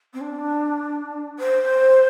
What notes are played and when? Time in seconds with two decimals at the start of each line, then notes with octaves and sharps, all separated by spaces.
0.13 C4
0.20 D4
1.39 C5